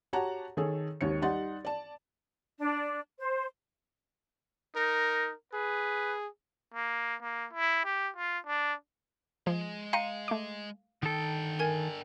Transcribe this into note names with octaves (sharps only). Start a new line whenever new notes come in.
F#4 G4 C#5 F#5 A5 A#5
D#3 G#4 A4 C#5
G#1 D#2 D#3 C#5 C#7
G3 D#4 F#5 C6 A6
D5 A5
D4
C5
D#4 A#4
G#4 B4
A#3
A#3
E4
G4
F4
D4
F3 G#3
F5 G5 A#5 C6 C#7 D#7
A3 D6
D3 D#3 A4 G5
A#4 G#5 G#6